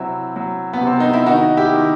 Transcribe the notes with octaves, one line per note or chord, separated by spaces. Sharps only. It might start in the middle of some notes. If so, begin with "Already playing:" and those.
Already playing: C3 F#3 C4 E4
F#3
B3
C3
C4
D#4
E4
D#3 D#4 F#4
E4 G4
D#3